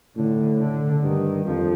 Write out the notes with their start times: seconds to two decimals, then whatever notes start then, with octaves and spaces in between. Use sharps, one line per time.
0.16 A2 D3
0.59 D3
1.03 G2 D#3
1.46 F2 F3